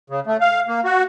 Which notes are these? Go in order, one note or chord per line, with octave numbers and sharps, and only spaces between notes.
C#3
A3
F5
A#3
F#4